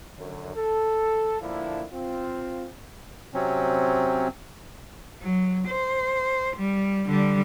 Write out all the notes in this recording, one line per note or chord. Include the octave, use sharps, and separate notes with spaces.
F#2 D3
A4
A#2 D3 F3 A#3 D4 E4
C4 F4
C3 F#3 C4 C#4
F#3
C5
G3
D3 G3